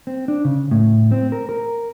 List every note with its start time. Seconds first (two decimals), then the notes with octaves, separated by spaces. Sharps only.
0.07 C4
0.28 D4
0.45 C#3
0.71 A2
1.12 C4
1.32 A#4
1.49 A#4